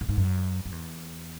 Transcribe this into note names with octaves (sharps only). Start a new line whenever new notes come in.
A2
G#2
F#2
F#2
E2